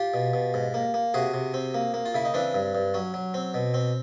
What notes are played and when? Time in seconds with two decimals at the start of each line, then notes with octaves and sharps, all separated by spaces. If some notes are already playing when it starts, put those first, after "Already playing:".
Already playing: F4 G4
0.14 B2
0.34 B2
0.54 G#2
0.74 A#3
0.94 A#3
1.14 C3 F#4 G#4
1.34 C3
1.54 C4
1.74 A#3
1.94 A#3
2.06 F4
2.14 C#3 E4
2.25 D#4
2.34 E3 C4 D4
2.54 G2
2.75 G2
2.94 F#3 C#4
3.14 F#3
3.34 C4
3.54 B2
3.74 C4